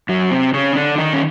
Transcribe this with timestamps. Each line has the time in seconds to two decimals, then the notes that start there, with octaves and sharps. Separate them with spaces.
0.09 F#2 F#3
0.31 C3 C4
0.53 C#3 C#4
0.76 D3 D4
0.98 D#3 D#4
1.13 C#4